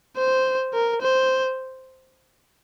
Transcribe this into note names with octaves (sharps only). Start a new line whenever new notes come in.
C5
A#4
C5